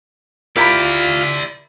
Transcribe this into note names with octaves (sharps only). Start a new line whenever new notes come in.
E4 F4 G4 A#4 D5 E5 A#5 B5